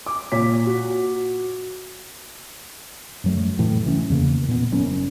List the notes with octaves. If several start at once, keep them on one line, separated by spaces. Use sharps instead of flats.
D6
A#2 C#5 B6
F#4
F#2 F#3 A3
F1 A2 E3
C2 E3 A3 C#4
E2 C#3 A#3
A#2 B3
F#1 F#2 C#4